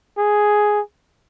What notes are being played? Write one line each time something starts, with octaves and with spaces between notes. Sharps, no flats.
G#4